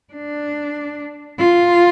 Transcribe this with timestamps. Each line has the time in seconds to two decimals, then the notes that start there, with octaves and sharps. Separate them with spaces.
0.13 D4
1.39 F4